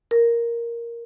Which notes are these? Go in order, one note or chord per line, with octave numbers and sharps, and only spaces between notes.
A#4